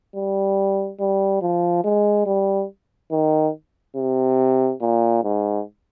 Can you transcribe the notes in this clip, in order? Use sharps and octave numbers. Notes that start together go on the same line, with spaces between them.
G3
G3
F3
G#3
G3
D#3
C3
A#2
G#2